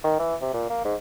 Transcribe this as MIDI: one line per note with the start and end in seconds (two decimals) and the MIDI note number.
0.04 0.17 51
0.19 0.35 52
0.41 0.53 48
0.54 0.66 46
0.70 0.81 58
0.85 0.95 44